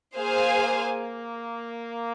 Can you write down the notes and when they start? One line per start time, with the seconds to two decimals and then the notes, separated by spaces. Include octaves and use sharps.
0.16 A#3 G#4 C5 F5 G#5